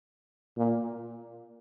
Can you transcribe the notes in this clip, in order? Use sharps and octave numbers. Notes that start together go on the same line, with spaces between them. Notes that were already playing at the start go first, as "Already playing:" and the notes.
A#2